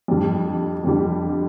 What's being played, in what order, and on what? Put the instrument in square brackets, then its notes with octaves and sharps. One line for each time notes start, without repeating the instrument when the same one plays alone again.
[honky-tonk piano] F2 D3 G3
F2 D3 G3